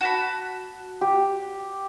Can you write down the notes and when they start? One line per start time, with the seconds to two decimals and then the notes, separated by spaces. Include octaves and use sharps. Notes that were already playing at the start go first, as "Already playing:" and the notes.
0.01 F#4 A5 B5
1.01 G4